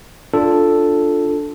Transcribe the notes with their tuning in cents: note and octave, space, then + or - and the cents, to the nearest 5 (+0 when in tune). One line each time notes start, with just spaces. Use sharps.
D4 +0 F4 +0 A4 +0